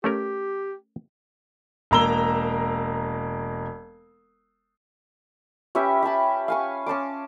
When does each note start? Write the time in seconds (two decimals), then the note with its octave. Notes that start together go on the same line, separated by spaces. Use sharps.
0.04 A3 C#4 G4 A#4
1.91 E1 A#3 A#5 E6 G7
5.75 C#4 G4 B4 E5
6.03 E5 G5 A5 B5
6.48 F5 G#5 C#6
6.86 C#4 A5 C6 D6